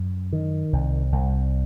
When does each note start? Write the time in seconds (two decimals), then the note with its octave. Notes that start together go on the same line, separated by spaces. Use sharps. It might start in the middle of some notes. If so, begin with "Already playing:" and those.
Already playing: F#2
0.33 D#3
0.73 C2
1.12 C2